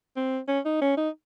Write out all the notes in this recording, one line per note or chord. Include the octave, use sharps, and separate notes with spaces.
C4
C#4
D#4
C#4
D#4